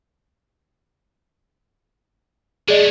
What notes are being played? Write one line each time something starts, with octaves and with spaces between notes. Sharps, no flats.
G#3 A3 G#4 D5 D#5